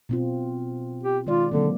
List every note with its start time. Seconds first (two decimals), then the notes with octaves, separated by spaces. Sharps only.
0.09 B2 C4 F4
1.03 G4
1.27 D#3 G#3 F4 D5
1.52 D3 F#3 A#3 C4